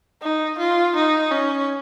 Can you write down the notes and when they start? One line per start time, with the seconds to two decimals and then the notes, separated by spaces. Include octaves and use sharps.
0.22 D#4
0.58 F4
0.96 D#4
1.31 C#4